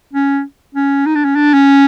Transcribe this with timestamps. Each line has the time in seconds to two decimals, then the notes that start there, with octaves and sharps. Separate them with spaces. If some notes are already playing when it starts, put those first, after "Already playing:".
0.13 C#4
0.75 C#4
1.06 D#4
1.15 D4
1.25 C#4
1.35 D4
1.54 C#4